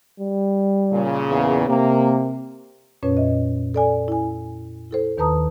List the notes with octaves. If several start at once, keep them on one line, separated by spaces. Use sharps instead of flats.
G3
A#2 C#3
E2
C3 A#3
F2 A#2 C#4 B4 C#5
D#5 E5
A4 D5 G#5
E4 G#5
E4 A4 C5
D#2 D#3 B4 A5 A#5 D#6